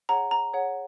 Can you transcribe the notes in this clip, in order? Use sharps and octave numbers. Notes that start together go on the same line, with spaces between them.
G#4 C#5 F#5 A#5
A#5
G#4 C#5 F#5